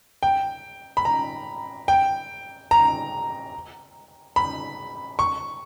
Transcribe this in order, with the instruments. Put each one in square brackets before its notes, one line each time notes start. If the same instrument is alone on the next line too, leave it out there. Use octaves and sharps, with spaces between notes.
[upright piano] G5
B5
A#5
G5
A#5
B5
C#6